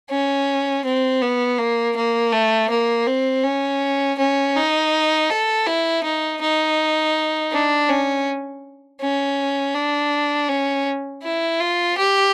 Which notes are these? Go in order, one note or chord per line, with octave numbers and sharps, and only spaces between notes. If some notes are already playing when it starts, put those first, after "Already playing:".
C#4
C4
B3
A#3
A#3
A3
A#3
C4
C#4
C#4
D#4
A4
E4
D#4
D#4
D4
C#4
C#4
D4
C#4
E4
F4
G4